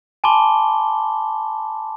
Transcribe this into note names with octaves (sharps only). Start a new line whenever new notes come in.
G#5 A5 B5 C6 D6 G7